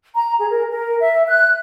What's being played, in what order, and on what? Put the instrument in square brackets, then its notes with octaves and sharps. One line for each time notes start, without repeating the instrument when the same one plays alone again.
[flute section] A#5
G#4
A#4
A#4
E5
F#6